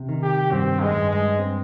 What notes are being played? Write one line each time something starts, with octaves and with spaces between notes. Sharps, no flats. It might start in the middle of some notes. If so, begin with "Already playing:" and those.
Already playing: C3
D#3
G4
G2 C4
G#3
G2
G#3
C4